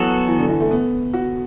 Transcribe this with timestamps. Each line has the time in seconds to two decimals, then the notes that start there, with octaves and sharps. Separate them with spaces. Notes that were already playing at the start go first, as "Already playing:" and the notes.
Already playing: E3 F#3 B3 F#4 A4
0.28 E3
0.39 D3
0.49 E3
0.60 A3
0.71 B3
1.14 F#4